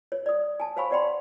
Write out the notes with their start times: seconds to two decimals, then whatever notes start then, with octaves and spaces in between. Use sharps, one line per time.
0.12 C#5
0.26 D5 D#6
0.60 G#5 A5
0.77 C5 C#5 F5 G#5 B5 C#6
0.91 C#5 D5 F#5 G5 B5 C6